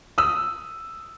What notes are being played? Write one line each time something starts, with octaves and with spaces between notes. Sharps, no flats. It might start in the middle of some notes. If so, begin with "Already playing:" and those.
D#6 E6